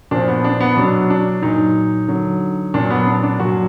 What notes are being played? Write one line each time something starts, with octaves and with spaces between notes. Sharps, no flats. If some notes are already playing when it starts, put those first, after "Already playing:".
A#2 F3 D4
B3
D4
B3
B2 F#3 D4
D4
A#2 F#3 D#4
D3 F#3
A#2 F#3 D4
B3
D4
D4
A#2 F#3 F#4